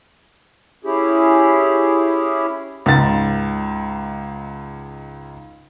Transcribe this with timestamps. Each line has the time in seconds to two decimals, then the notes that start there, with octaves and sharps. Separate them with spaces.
0.85 C#4 E4 G4 G#4
2.86 C#2 G#2 A6